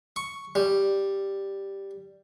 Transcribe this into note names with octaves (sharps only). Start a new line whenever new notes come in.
C#6
G3